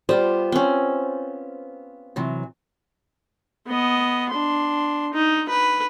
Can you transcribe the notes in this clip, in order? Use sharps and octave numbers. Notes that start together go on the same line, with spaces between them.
G3 B3 F4 C5
C4 C#4
C3 E3 F#3
B3 D#5
D4 C6
D#4
B4